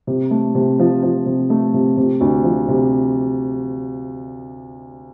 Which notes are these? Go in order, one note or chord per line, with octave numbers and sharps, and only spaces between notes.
C3
A3
C3
F3
F3
C3
A3
C3
C3
D2
F3
C3